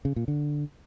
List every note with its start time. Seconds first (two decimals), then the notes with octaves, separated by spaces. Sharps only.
0.05 C#3
0.16 A#2
0.28 D3